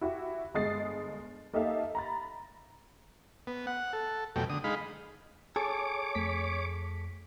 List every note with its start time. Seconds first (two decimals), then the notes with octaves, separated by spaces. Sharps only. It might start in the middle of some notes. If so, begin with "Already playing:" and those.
0.01 E4 F#4 G4 E5
0.54 G1 G#3 D#5 D#6 A6 C7
1.53 A#3 D#4 G4 A4 E5 F5
1.95 A#5 B5 A6
3.47 B3
3.67 F#5
3.93 A4
4.36 F2 B2 F#3 A3 G5
4.49 D3 D#6
4.64 G#3 D#4 F5 B5
5.56 G#4 A4 C#5 D6
6.15 F2 A3 B6